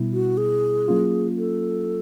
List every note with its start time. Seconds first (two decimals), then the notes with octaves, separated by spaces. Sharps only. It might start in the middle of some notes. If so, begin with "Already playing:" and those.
Already playing: B2 G3 B3 E4
0.13 F#4
0.37 G#4
0.88 F#3 A#3 C#4 F4
1.38 A4